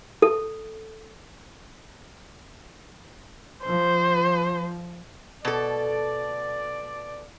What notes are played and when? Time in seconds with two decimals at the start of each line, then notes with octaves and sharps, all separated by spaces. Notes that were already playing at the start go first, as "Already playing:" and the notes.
0.22 A4
3.66 F3 C5
5.45 B2 A4 D5